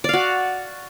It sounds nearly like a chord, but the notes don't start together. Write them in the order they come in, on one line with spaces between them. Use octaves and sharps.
D5 F5 F#4